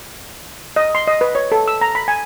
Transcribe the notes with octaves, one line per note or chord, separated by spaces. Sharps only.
D#5
C6
D#5
B4
C#5
A4
E6
A#5
B5
G#5